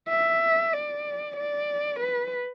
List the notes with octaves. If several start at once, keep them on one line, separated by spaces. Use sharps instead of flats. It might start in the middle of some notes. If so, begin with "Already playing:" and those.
E5
D5
D5
B4